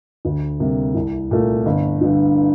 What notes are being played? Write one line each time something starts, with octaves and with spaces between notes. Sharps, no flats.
D2
C3 G3 A#3
C2
A#2 A3
G1
G2 D3